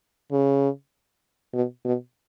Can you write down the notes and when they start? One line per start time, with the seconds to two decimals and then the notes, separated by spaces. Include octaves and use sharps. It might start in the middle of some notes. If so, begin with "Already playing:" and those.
0.32 C#3
1.54 B2
1.85 B2